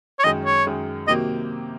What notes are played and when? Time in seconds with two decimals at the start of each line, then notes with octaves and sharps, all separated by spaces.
0.19 C#5
0.24 F#2 D#3 G#3 D#5
0.45 C#5
0.66 F#2 D#3 G#3
1.07 C3 D#3 F#3 A#3 D#5